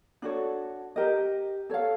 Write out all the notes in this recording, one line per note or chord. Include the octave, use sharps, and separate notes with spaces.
D4 F#4 A4 C#5
G4 A#4 D#5
A4 C#5 F5